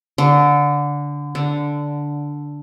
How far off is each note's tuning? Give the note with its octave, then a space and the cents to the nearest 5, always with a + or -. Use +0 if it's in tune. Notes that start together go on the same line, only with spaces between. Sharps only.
D3 -15
D3 -5